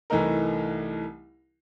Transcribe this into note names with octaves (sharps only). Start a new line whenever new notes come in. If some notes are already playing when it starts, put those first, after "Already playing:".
C2 E3 A3 D#4 A#4